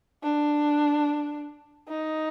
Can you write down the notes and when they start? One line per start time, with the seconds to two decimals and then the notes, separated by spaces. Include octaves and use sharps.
0.23 D4
1.88 D#4